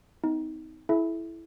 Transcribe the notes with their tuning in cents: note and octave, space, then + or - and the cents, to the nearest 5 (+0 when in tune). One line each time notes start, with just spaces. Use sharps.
C4 -40 D#4 +20
E4 +0 A4 -45 E5 +0